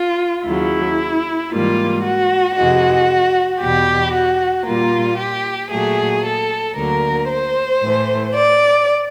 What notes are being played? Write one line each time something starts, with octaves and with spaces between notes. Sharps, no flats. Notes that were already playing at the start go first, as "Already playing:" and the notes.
Already playing: F4
D#2 C#3 F#3 E4
G#2 E3 G3 A#3 F4
F#4
F2 C3 E3 G#3 F#4
E2 B2 G3 G4
F#4
A#2 G3 A#3 F4
G4
A#2 F#3 A3 G#4
A4
D2 D3 F#3 A#3 A#4
C5
A2 E3 A3
D5